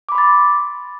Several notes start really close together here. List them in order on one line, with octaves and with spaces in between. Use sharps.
D6 B5 C6 A6